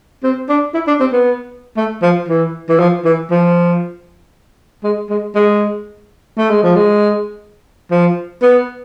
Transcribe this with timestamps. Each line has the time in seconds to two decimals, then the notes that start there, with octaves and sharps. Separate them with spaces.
0.23 C4
0.49 D4
0.74 E4
0.87 D4
1.00 C4
1.12 B3
1.77 A3
2.02 F3
2.28 E3
2.69 E3
2.80 F3
3.05 E3
3.31 F3
4.84 G#3
5.10 G#3
5.35 G#3
6.38 A3
6.50 G#3
6.63 F3
6.76 G#3
7.91 F3
8.42 B3